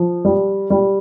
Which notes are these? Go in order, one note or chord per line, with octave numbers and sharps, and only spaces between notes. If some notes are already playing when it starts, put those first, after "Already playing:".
Already playing: F3
G3
G3